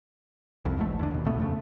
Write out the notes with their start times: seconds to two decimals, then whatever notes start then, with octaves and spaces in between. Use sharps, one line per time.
0.65 C2 F2
0.78 G#1 E2 G#2 A3
0.99 E2 D3
1.10 D#2 B2
1.25 B1 B2 A3 B3
1.38 F2 C#3 A3